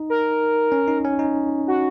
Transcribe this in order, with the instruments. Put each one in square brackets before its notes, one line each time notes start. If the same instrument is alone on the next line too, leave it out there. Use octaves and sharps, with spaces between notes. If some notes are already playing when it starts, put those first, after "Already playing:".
Already playing: [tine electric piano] D#4
[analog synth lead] A#4
[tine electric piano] C#4
D#4
C#4
D#4
[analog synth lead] F#4